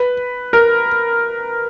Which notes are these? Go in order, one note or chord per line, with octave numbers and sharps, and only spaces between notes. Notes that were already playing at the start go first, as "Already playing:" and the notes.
Already playing: B4
A#4